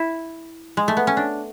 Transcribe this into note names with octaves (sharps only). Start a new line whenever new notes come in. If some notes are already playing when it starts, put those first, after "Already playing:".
Already playing: E4
G#3
A3
B3
C#4
D4